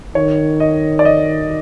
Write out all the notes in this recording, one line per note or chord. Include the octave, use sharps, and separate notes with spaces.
D#3 C#5
D#5
D5
D#5